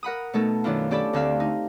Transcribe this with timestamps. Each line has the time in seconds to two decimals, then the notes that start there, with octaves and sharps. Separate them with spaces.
0.03 A#4 F#5 B5 D#6
0.34 B2 A3 D#4 A4
0.64 F#2 D#3 D4 E4 F4
0.91 C#4 D4 G4 A4 D5 B5
1.13 D2 D3 C4 E5 F5
1.40 D#4